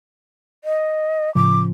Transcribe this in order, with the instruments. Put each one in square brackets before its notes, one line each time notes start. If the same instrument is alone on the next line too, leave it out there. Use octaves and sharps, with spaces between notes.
[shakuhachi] D#5
[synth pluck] A2 C#3 F3 [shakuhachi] D6